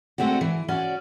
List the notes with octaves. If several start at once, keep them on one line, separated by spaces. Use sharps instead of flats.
G#3 A3 C4 D4 F#4
E3
C#4 F#4 D5